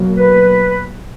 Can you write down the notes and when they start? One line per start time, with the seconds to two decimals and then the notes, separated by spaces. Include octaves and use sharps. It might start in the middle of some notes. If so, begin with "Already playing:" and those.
Already playing: B2 F#3 A#3
0.17 B4